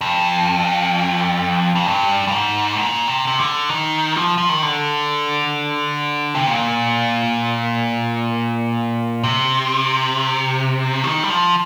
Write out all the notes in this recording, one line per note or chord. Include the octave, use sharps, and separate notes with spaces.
F2
F2
G2
G2
G#2
A#2
C3
C3
D3
D#3
F3
F3
D#3
D3
C3
A#2
C3
F3
D#3
G3
F3